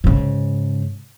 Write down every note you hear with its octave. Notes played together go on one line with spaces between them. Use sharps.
G#2 C#3